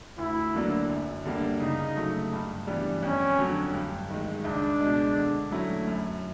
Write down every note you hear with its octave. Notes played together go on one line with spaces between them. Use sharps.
D2 E4
D3 F#3 A#3 D4
F#2
D3 G3 A#3
C#3 D#4
F#3 A3
G2
E3 G3 B3 D4
F2 C#4
D3 F#3
G2
D#3 G#3
C#2 D4
B2 G#3
D3
F#3 A3 C#4 E4
F#2